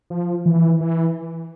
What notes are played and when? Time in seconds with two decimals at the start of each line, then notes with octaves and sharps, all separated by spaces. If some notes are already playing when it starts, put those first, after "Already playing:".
0.10 F3
0.46 E3
0.81 E3